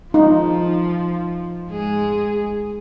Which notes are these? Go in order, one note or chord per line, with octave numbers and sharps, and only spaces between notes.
F3 D#4
G#2 G#3 G#4